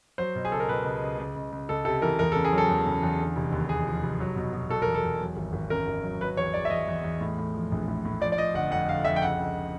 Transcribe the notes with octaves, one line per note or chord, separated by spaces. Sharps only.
F#3 C5
B2
G#4
C#2 A4
A#4
B2 B4
C#2
C#2
C#2
C#2
C#2
C#2 A4
C3 A4
E3 A#4
E2 A#4
C#3 A4
G#4
F#3 A4
E2
C#3
E2
D3
F1
D#2
D#2 G#4
F3
F1
F#3
B2
B2
B2 A4
A#4
E2
A4
E2
F#3
G#1
G#1
F#2 A#4
G#1
F#3
F#3 B4
E2 C#5
E2 D5
E5
E2 D#5
E2
E2
A2
A2
F3
A#1
A2
A2
F3 D5
D5
F3 D#5
G1 F#5
F2 F#5
G1 F5
F2 E5
G5
C#2 F#5
C#2